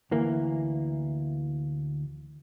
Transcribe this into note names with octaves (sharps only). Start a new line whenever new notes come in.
D2 E3 A#3